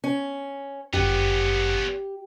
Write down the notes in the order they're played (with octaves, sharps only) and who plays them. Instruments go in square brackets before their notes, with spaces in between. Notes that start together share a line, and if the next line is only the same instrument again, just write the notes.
[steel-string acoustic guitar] C#4
[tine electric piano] G1 F#2 [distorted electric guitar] B3 C#4 [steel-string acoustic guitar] G4